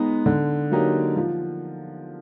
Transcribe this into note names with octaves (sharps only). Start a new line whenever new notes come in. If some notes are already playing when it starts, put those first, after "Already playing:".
Already playing: G#3 B3 D#4
D3
F#3 A#3 D#4 G4
F3